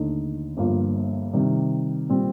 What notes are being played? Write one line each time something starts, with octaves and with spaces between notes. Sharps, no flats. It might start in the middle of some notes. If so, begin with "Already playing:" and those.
Already playing: D#2 D3 A3 D#4
G1 G2 F3 A#3 F4
C3 D#3 G3
A#2 G3 C4